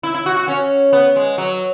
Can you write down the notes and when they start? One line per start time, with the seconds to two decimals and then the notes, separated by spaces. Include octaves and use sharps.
0.03 E4
0.14 E4
0.26 F#4
0.36 F#4
0.48 C#4
0.93 B3
1.16 G#3
1.38 F#3